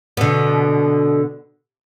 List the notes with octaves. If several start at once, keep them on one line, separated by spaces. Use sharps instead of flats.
B2 D3